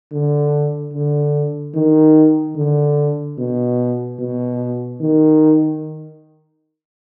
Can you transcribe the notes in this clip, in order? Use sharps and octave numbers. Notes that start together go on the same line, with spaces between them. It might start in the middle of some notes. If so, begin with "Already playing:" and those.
D3
D3
D#3
D3
B2
B2
D#3